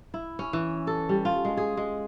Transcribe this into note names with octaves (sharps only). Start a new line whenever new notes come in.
E4
C#4
E3
A4
G3
F4
G#3
G#4
G#3